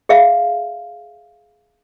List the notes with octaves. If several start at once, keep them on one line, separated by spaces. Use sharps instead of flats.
G#4 E5 F5